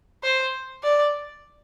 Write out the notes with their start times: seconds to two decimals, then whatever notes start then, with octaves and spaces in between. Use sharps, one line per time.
0.23 C5
0.83 D5